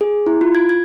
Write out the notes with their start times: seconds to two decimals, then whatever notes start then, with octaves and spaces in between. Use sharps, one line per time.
0.01 G#4
0.26 E4
0.41 F4
0.55 G#6
0.69 G#6